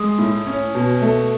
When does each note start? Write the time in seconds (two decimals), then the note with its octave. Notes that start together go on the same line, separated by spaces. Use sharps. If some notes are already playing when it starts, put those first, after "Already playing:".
Already playing: G#3 D#6
0.18 A2
0.47 C#4
0.75 B2
1.02 A3